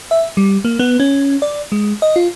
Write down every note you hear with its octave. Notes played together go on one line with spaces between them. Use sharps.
E5
G3
A#3
B3
C#4
D5
G#3
D#5
F4